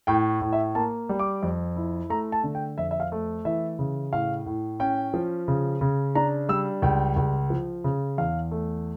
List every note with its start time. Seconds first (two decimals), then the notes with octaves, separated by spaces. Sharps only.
0.07 A2 G5
0.41 A2
0.53 E5
0.75 A#3 A5
1.09 G3
1.19 D6
1.43 F2
1.76 E4
2.10 A3 A#5
2.32 A5
2.44 D3
2.55 G5
2.78 F2 E5
2.91 E5
3.00 F5
3.12 A3
3.45 E3 E5
3.79 C#3
4.13 A2 F5
4.46 A2
4.80 C#4 G5
5.14 F3
5.48 C#3
5.81 C#3
6.15 D4 A#5
6.49 G3 E6
6.82 C#2 G5
7.16 C#2
7.50 F3
7.84 C#3
8.18 E2 F5
8.51 A3